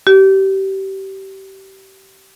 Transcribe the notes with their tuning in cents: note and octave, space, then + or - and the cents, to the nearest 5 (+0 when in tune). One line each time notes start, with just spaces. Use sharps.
G4 -25